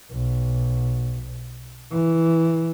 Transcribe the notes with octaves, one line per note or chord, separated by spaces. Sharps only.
B1
E3